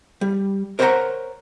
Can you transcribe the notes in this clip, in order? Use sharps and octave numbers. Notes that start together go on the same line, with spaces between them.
G3
A#4 C5 C#5 F5 F#5 A#5